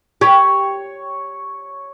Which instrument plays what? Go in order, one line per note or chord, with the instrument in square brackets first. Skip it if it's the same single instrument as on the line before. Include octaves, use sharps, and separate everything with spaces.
[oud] G4 [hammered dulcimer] C#5